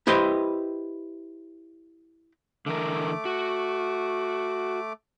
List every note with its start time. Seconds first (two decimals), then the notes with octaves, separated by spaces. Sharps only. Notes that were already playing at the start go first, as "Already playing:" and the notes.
0.07 E4 G4 B4 C5 D#5 G5
2.66 D3 E3 A3 A#4 D6
3.25 F#4